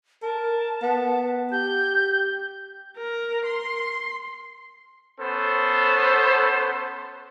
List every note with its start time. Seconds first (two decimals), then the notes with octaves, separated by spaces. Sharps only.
0.22 A#4 A5
0.82 B3
1.52 G4 G6
2.97 A#4
3.45 C6
5.20 B3 C#4 A4 C5